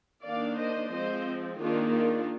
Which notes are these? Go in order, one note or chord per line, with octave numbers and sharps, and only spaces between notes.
D#3 A#3 D4 D5 F5
C5 D#5
F3 G#3 C4 C5 D#5
D#3 A#3 D4 F4 G#4
D4 F4